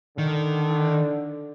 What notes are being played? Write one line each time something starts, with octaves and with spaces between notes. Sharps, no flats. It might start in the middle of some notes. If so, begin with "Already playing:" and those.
D3 D#3